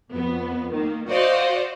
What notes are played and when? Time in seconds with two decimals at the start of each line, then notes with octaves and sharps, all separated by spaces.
0.11 F2 B3
0.71 D#3 A#3
1.08 F#4 C5 D5 D#5 F5